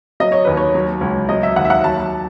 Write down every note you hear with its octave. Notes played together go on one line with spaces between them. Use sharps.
F#3 D#5
C#5
D#2 B4
C#5
F#3
C#2
F#3 D#5
E5
D#2 F#5
E5
F#5
F#3 A5